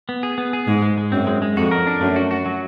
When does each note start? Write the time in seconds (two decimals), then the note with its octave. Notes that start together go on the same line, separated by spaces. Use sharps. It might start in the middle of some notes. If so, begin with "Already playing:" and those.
0.09 B3
0.23 G#4
0.38 B3
0.53 G#4
0.67 G#2 G#3
0.82 G#3
0.98 G#3
1.12 F#2 C4
1.27 G#3
1.42 G#3
1.57 F2 F#4
1.71 A#4
1.87 D4
2.01 F#2 A3
2.16 F#4
2.31 F#4
2.46 F#3